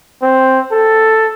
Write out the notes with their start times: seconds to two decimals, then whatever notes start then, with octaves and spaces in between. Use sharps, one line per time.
0.23 C4
0.72 A4